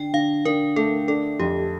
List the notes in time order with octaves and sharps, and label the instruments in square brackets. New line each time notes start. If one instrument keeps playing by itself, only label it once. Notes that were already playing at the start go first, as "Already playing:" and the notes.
Already playing: [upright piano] D3 [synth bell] G5
[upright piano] D3 [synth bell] F5
[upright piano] D3 [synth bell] A#4
[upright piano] A3 [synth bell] A4
[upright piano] D4 [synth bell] A4
[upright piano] F2 [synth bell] G4